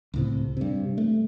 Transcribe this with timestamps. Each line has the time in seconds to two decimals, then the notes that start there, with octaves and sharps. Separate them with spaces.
0.14 C#2 A2 C3
0.57 G2 C3
0.98 A3